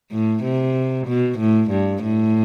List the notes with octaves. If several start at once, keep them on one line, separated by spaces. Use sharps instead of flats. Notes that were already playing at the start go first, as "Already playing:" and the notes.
A2
C3
B2
A2
G2
A2